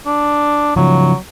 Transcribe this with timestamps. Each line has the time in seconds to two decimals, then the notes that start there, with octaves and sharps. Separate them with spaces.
0.06 D4
0.76 C#3 F3 F#3